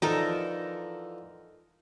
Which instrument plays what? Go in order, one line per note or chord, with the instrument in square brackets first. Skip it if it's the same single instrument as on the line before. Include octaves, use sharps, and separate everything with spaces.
[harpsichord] D3 E3 F3 [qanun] D#4 A4 A#4